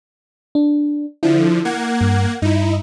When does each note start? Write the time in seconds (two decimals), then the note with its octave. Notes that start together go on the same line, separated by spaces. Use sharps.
0.55 D4
1.23 D3 F3 E4
1.65 A#3 F#5 G#6
2.01 G2
2.42 G2 D#4 E4